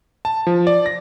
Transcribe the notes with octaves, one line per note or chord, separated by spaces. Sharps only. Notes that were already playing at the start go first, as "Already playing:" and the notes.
A5
F3
D5
A#6